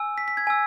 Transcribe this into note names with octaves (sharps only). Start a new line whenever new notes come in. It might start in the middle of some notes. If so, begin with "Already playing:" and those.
Already playing: G#5 E6
B6
B6
G#6
G#5 E6